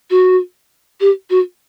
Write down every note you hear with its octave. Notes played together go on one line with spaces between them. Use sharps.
F#4
G4
F#4